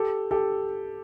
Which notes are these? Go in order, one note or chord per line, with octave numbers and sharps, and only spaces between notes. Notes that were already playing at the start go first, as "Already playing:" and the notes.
Already playing: G4 A4
G4 A4